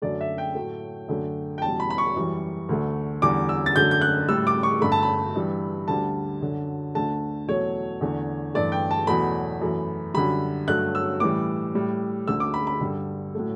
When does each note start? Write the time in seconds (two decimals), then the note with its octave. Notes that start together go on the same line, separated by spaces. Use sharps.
0.02 F#2 D3 A3 D5
0.21 E5
0.38 G5
0.55 A2 F#3 A3
1.08 F#2 D3 A3
1.58 G5
1.62 E2 B2 G3 A5
1.80 B5
1.90 B5
1.98 C#6
2.16 F#2 E3 G3
2.69 D2 D3 A3
3.22 E2 D3 G3 D6
3.49 E6
3.66 A6
3.75 F#2 D3 A3 G6
3.91 G6
4.01 F#6
4.28 A2 G3 E6
4.47 D6
4.63 C#6
4.81 G2 D3 A3 B5
4.92 A5
5.03 B5
5.36 G2 E3 G3
5.88 D2 D3 G3 A5
6.41 F#2 D3 F#3
6.95 D2 D3 A3 A5
7.47 E2 B2 F#3 A3 C#5
8.01 E2 D3 A3
8.54 G2 E3 A3 D5
8.72 G5
8.91 A5
9.07 E2 B2 F#3 A3 B5
9.61 F#2 E3 A3
10.14 F#2 D3 G3 B5
10.68 G2 F#3 A3 F#6
10.95 E6
11.20 A2 E3 G3 D6
11.75 A2 G3
12.27 D2 D3 A3 E6
12.40 D6
12.54 B5
12.67 B5
12.81 G2 D3 G3
13.35 A2 F#3 A3